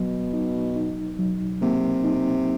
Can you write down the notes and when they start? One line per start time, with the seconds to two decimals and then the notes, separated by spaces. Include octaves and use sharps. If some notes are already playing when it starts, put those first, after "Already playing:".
Already playing: B2 F#3
0.33 D#4
0.76 D#4
1.19 F#3
1.61 C3 A#3
2.04 D#4